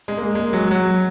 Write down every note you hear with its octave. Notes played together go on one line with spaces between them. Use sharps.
G#3
A#3
G#3
F#3
F#3